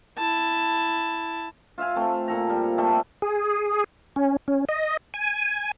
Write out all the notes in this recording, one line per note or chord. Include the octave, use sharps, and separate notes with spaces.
E4 A5
F4 E5 F5 G#5
A3 C4
A#2 A4 A#5
G3
G3 A3 A4 E5
G#4
C#4
C#4
D#5
G#5